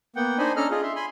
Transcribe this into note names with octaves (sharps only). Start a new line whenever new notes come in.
A#3 B3 F#5 G5
D4 D#4 C5 D#5 G#5 B5
C#4 D4 A4 D#5 A#5 F6
F4 G#4 D#5
E5 C6
G#5 B5 C6